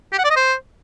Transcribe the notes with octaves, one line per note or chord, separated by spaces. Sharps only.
G4
F#5
D5
D#5
C5